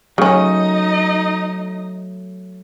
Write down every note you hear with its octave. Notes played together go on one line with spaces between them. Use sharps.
C#3 F#3 A3 C#4 D#4 D#5